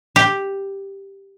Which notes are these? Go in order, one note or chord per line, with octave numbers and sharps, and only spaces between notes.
G4